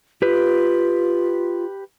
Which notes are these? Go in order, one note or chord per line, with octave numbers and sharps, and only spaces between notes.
F4 G4 B4